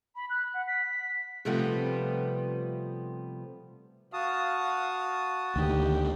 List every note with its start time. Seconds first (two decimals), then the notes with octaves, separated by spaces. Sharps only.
0.15 B5
0.29 F#6
0.53 F#5
0.67 B6
1.45 C3 F3 G3 A3 B3 C4
4.13 F#4 F5 A5 D#6
5.56 D2 D#3 G4